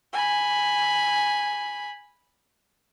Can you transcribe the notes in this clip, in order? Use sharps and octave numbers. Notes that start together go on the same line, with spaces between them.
G#5 B5